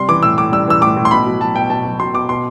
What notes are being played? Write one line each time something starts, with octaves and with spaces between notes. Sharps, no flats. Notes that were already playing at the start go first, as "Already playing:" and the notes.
Already playing: C3 G3 C6
E3 D6
A2 E6
A2 D6
G3 E6
E3 E6
A2 D6
A2
C6
B2 B5
F#3
F#3 A5
B2 G5
B2 A5
F#3
F#3 C6
B2 D6
B2 C6